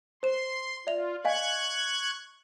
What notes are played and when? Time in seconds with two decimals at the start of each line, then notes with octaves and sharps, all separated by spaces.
0.23 C5 C6 E7
0.87 F4 D5 E5 F7
1.25 D#5 F5 G#5 C#6 F#6 G#6